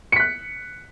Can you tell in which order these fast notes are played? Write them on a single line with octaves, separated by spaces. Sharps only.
C#7 B6 F#6